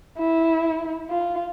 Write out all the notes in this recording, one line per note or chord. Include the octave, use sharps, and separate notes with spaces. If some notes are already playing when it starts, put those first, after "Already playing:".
E4
F4